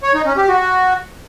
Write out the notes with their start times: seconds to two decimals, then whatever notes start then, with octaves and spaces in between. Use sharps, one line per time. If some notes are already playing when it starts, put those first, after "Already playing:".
0.03 C#5
0.14 D#4
0.26 C#4
0.37 G4
0.49 F#4